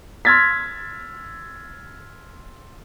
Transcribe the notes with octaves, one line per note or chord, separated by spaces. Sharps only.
C6 E6 F6 G#6 A6 B6